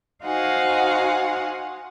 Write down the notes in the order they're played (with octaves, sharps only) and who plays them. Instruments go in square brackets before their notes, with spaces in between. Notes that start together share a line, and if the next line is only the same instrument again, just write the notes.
[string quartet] D#4 F#4 C5 F5 F#5 G#5